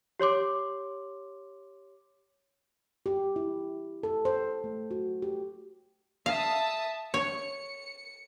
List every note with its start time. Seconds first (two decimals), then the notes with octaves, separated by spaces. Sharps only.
0.20 G4 C#5 C6 D6
3.06 G4
3.36 E4
4.03 A4
4.25 C5
4.64 A3
4.91 F#4
5.22 G4
6.26 E5 F5 A5 D#6
7.14 C#5 C#7